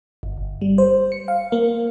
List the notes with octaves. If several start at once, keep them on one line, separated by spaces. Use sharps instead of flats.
G1
G1
G3
C5
C#7
F5
A#3